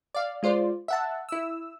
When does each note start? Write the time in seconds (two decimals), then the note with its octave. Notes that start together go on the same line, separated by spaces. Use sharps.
0.15 D5 F5
0.43 G#3 F4 C5 D5
0.88 E5 F#5 A5
1.29 E4 E6